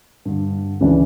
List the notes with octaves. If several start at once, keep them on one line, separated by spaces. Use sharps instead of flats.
G2 D3
C#2 C#3 E3 D4